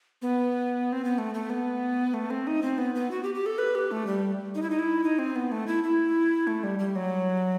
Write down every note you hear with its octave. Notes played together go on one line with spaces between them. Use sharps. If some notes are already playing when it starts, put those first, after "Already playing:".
B3
C4
B3
A3
A3
B3
A3
C4
D#4
C4
B3
B3
F#4
G4
G4
A4
B4
G4
A3
G3
D#4
E4
D#4
E4
D#4
C4
B3
A3
E4
E4
A3
G3
G3
F#3